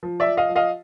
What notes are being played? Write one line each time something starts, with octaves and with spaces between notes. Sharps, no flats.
F3
D5 E5
F3
D#5 F5
F3
D#5 F5